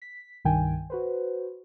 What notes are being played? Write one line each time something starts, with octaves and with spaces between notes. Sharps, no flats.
B6
C2 G2 D#3 G5 G#5
F#4 B4 C5